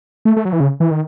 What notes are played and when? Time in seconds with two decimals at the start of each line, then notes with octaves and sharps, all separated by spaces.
0.25 A3
0.36 A3
0.45 F#3
0.53 E3
0.60 C#3
0.80 E3
0.91 D#3